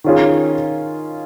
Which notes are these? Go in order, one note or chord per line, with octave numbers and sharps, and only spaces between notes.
D#3 C#4 F4 G#4